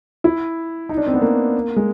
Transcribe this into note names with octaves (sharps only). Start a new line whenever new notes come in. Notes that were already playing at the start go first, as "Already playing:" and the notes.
E4
D#4
D4
C4
B3
A#3
G#3